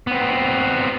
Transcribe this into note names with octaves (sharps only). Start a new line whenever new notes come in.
B3 C4